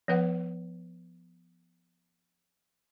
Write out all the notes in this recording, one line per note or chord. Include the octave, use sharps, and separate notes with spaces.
F3 B3 B4 F#5